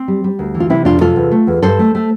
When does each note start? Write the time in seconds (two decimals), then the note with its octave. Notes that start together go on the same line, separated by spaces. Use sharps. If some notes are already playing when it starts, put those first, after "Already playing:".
Already playing: C4
0.08 G3
0.24 G3
0.39 D2
0.54 E3
0.60 F4
0.70 C3 C4 E4
0.85 F2 D4 F4
1.01 C3 F4 A4
1.16 E2
1.32 A3
1.47 E2
1.63 G2 A4 C5
1.79 A3
1.95 A3